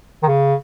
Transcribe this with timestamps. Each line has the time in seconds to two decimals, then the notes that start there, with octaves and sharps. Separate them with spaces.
0.23 D#3
0.28 C#3